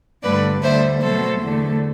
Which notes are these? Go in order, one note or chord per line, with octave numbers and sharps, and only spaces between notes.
G2 D3 A3 B4 D5
D2 D3 G3 C5 E5
B2 F#3 A3 A4 C5
E2 D3 A3